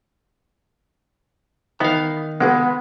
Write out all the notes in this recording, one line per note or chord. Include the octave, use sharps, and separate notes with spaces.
D#3 E3 B3 F5
A#1 G#3 B3 G4 A4